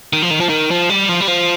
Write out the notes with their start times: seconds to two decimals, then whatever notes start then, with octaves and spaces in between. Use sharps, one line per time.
0.13 D#3
0.22 F3
0.31 D#3
0.40 F3
0.49 D#3
0.71 F3
0.90 G3
1.09 F3
1.21 G3
1.28 F3